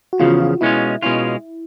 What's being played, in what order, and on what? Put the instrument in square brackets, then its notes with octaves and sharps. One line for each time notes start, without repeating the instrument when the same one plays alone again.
[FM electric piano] F#4
[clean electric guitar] E2 C#3 F3 [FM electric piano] F4
[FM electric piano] F4
[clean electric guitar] B2 G#3 C#4 F4 [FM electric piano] E4
[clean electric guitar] B2 G#3 C#4 F4 [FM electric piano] E4